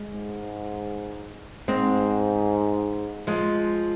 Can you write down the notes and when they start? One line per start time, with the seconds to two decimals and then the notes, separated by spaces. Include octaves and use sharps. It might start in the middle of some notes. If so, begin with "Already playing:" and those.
Already playing: G#3
0.08 G#2
1.68 G#2 G#3 C4
3.27 F3 G#3